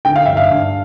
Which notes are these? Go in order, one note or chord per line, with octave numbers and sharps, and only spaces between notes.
D3 G5
F5
G2 E5
F5
G2